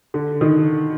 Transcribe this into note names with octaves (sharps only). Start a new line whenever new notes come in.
D3
D#3